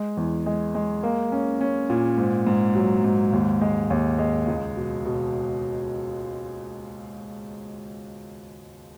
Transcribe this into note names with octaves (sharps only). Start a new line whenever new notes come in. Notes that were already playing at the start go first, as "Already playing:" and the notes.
Already playing: G#3
E2
G#3
G#3
A#3
C#4
C#4
A#2
G#2
G#2
F#3
G#2
D#2
G#3
D#2
G#3
C#2
B2
B2